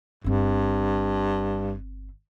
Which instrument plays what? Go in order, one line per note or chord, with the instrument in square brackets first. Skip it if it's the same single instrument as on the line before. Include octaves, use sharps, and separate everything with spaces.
[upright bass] G1 C4 [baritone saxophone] G2